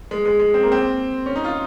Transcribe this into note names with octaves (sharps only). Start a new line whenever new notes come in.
G#3
G#3
G#3
C4
A#3
C4
C#4
D#4
F4